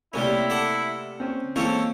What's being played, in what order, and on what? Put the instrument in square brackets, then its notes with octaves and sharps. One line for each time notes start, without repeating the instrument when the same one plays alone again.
[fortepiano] C3 A3 A#3 [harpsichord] G3 C#4 [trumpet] E4
[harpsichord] A4 D5 F#5
[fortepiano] C4 C#4
[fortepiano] E3 G#3 C4 [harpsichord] A#3 C#4 C#5 [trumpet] A4